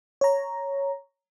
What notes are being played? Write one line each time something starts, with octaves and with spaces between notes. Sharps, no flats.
C#5 A#5